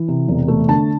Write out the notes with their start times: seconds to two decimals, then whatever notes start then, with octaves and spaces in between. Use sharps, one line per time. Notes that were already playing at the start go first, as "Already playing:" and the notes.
Already playing: E3
0.08 C3
0.28 E1
0.48 A3
0.69 D3 A5